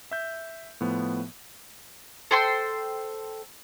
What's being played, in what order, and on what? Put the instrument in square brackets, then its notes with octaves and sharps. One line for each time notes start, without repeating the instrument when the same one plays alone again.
[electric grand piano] E5 G6
A2 F3 B3
[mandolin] A4 C5 G5 C6